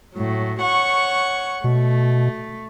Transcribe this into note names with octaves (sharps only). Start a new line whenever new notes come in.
A2 F#3
C#5 F#5 C#6
B2 A3